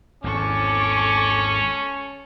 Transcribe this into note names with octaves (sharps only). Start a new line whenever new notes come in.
G#1 E2 C#4 A4 C#6 D6